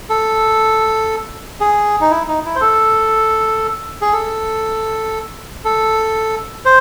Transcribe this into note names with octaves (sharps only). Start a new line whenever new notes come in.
A4
G#4
D#4
E4
D#4
E4
C5
A4
G#4
A4
A4
C5